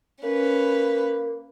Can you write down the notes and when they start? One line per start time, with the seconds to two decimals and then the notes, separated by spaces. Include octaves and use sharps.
0.23 A#3 C#4 B4